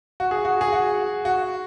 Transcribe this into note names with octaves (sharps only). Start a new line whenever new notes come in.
F#4
G#4
F#4
G#4
F#4
F#4